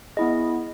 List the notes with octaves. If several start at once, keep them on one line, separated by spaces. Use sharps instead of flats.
B3 E4 G#4 D#5